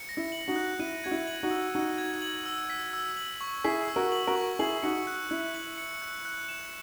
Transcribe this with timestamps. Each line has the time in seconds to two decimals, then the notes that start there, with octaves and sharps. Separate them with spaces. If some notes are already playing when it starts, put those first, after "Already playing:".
Already playing: C#7
0.09 A#6
0.17 E4
0.32 F#7
0.48 D#4 F#4
0.56 F#6
0.79 E4 D#7
1.04 F#4 G#6
1.11 E4
1.27 F#7
1.43 D#4 F#4
1.51 E6
1.74 D#4 F#4 D#7
1.98 G#6
2.22 F#7
2.46 E6
2.70 B6
2.93 E6
3.17 F#7
3.41 C#6
3.64 E4 G#4 B6
3.88 E6
3.96 F#4 A#4
4.12 F#7
4.27 F#4 A#4
4.36 C#6
4.59 E4 G#4 F#7
4.83 D#4 F#4 C#7
5.07 F#6
5.30 E4 F#6
5.55 F#7
5.78 C#7
6.02 F#6
6.25 F#6
6.49 E7